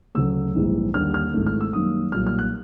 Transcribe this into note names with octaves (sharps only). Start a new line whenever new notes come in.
D2 C#3 F#3 A3 E6
A#1 G#2 E3 G3
D#2 D3 G3 A#3 F6
F6
G#1 G#2 E3 A3
F6
E6
F#2 D#3 G3 A#3 D#6
B1 A#2 G3 A#3 F6
F6
F#6